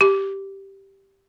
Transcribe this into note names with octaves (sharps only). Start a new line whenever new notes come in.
G4